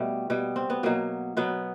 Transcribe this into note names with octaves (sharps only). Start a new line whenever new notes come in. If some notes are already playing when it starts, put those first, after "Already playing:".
Already playing: B2 G3 A3
B2 G3
C4
B3
B2 F#3 A#3
B2 F#3 B3